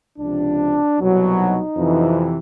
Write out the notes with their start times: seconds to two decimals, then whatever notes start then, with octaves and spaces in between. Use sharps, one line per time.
0.19 C#2 C3 F3 D4
0.97 C2 B2 F#3
1.36 D#4
1.76 F2 C3 E3